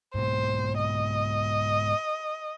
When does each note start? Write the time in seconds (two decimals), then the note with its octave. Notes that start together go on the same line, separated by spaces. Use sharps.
0.15 G#2 B2 C5
0.78 D#5